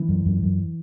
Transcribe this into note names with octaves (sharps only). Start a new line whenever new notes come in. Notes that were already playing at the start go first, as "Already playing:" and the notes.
Already playing: E3
F#2
F#2
F#2